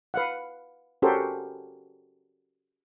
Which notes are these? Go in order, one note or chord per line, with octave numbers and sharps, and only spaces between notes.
B4 F5 F#5
C#4 F#4 G4 A4 A#4 C5